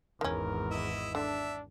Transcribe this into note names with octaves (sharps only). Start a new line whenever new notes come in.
G#1 E2 D#3 C#4 A#4
E4 D#5 E5
D3 D4 E5